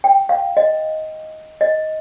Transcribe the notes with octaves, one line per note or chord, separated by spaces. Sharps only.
G5
F5
D#5
D#5